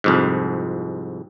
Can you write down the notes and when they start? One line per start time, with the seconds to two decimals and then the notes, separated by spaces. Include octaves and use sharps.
0.04 C2 F2 G#2